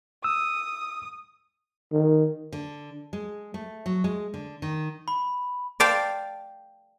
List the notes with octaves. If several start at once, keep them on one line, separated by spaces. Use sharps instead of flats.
D#6 E6
D#3
D3
G#3
A3
F#3
G#3
D3
D#3
B5
D5 F5 G5 A5 C6